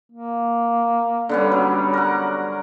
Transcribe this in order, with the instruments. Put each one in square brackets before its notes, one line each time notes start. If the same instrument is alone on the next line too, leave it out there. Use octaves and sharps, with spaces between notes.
[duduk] A#3
[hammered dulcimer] D3 B3 C#4 [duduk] G3
[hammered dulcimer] F#3
A#4 F#5